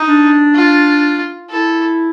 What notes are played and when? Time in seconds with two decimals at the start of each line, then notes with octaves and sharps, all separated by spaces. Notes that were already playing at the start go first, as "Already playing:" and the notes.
Already playing: D#4
0.08 D4
0.55 F4
1.49 E4 A4